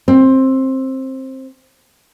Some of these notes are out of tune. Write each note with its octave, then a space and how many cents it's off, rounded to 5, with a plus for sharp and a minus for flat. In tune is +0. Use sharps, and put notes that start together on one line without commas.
C4 +15